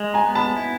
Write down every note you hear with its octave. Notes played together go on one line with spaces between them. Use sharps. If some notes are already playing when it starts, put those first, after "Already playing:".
Already playing: G#3
G#5 A#5
B3
A5 B5
E4